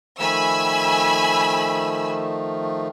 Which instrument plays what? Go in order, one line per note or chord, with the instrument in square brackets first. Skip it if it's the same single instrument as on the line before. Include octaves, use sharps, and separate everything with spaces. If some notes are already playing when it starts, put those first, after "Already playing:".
[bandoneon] D#3 F3 A3 [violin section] G#5 B5 E6